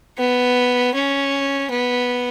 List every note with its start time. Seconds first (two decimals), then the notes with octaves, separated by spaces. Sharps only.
0.18 B3
0.94 C#4
1.71 B3